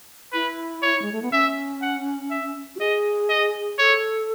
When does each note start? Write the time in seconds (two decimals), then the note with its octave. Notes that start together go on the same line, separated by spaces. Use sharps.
0.33 E4 B4
0.82 C#5
1.02 G#3
1.12 A3
1.22 B3
1.32 C#4 E5
1.82 F#5
2.31 E5
2.76 F#4
2.80 G#4 D#5
3.30 D#5
3.79 A4 C#5